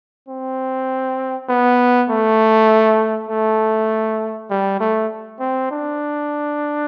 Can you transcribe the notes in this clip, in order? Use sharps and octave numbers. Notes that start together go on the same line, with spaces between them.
C4
B3
A3
A3
G3
A3
C4
D4